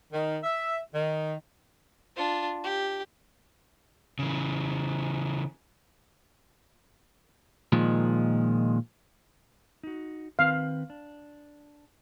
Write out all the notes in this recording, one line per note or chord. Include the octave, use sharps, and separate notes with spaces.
D#3
E5
D#3
D4 F4
G4
C#3 E3
A#2 D#3 F3 G#3
D#4 F#4
D#3 C4 B4 F5
D4